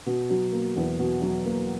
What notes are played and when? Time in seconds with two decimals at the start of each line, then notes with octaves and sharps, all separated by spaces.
0.06 B2
0.30 F#3
0.52 A#3
0.76 E2
0.99 B2
1.22 F#3
1.45 A#3